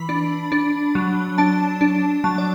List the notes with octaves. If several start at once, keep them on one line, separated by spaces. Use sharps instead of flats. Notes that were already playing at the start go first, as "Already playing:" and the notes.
Already playing: E3 B5
D4
D4
F#3
D4 A5
D4
F#3 A5
D5